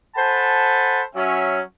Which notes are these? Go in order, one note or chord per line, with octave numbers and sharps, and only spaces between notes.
A4 C5 F#5 G#5 A5 B5
F#3 C#4 E5